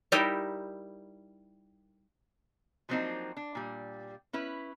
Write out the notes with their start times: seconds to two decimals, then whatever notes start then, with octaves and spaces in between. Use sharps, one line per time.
0.12 G3 D#4 E4 G4 A#4
2.89 F3 F#3 A#3 C4 D4 D#4
3.37 D4
3.55 A#2 G3
4.33 C#4 E4 B4